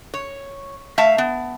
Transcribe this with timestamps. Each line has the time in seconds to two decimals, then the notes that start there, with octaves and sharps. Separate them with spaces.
0.14 C#5
0.98 A3 E5 F5 A5
1.18 B3